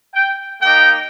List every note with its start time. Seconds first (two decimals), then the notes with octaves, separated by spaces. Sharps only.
0.14 G5
0.62 A#3 D#4 G4 G5